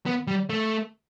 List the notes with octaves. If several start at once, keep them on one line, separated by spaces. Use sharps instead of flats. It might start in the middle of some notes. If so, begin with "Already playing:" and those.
B3
G3
A3